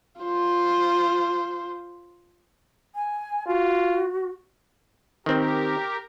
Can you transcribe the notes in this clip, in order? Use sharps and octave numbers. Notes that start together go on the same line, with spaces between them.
F4 C5
G#5
F4 F#4
D#3 C4 G4 A#4